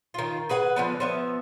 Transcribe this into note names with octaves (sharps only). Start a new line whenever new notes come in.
D#3 F4
G#4 B4 F#5 G#5
D3 F3 B3
F3 B3 E5